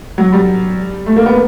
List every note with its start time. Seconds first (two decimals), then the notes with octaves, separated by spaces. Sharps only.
0.18 F#3
0.32 G3
1.06 A3
1.16 A#3
1.26 B3